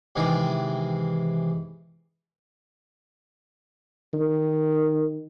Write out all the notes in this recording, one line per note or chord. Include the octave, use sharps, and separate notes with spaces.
C3 D#3 E3 G#3
D#3